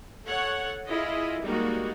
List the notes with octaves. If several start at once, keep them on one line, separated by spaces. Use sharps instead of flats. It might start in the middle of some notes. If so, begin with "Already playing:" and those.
A4 C#5 F#5
E4 F4 G#4 D#5
G3 G#3 A#3 D#4 F#4